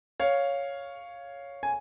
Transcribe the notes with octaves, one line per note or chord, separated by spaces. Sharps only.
C#5 F5
G#5